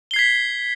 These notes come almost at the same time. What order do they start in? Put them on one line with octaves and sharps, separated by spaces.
G7 C7 G#6 B6